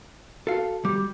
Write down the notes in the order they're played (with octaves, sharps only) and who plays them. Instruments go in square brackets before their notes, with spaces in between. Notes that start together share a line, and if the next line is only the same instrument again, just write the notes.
[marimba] F#4 [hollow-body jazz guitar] A4 F5
[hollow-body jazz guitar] G3 [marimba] D6